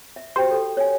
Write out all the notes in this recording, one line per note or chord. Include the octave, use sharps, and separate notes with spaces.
E5
F#4 G4 C5 G5
A4
C#5 G#5